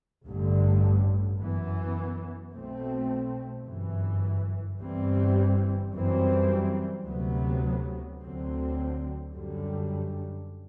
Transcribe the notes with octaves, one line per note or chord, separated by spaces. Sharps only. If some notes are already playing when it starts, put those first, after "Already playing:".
A1 G2 D3
F#2 E3 B3
B1 B2 A3 C4
G1 F#2 E3
G1 G2 E3 G3 C4
F#2 E3 G3 C4
D2 C3 F#3 B3
D2 D3 F#3 C4
F#2 D3 G3